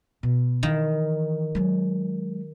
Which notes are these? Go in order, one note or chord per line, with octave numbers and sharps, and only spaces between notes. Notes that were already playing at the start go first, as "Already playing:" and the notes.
B2
D#3 E3
F#3 G#3